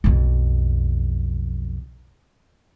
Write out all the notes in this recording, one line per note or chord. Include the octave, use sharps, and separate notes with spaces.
B1 F2